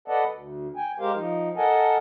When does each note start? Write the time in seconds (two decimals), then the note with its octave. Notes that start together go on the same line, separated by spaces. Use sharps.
0.08 A4 B4 D5 D#5 F#5 A5
0.30 D2
0.76 G5 G#5
1.00 G#3 G4 A#4 C5 F5
1.13 F3 D#4
1.57 A4 A#4 D#5 F#5 G#5 A5